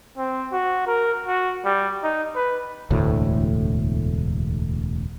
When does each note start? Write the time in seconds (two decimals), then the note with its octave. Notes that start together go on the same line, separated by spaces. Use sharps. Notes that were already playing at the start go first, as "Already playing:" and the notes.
0.17 C4
0.52 F#4
0.87 A#4
1.26 F#4
1.64 G3
2.03 D#4
2.35 B4
2.91 E1 D2 A2